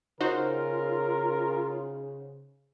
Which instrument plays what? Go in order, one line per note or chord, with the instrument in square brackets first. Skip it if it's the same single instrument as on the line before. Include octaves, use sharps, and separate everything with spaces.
[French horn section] C#3 [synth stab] D#4 F#4 C5 [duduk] F4 [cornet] A#4